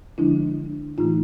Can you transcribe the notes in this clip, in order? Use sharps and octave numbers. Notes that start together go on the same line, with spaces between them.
D3 F3 G#3 D4 E4
A2 E3 A3 D#4 F4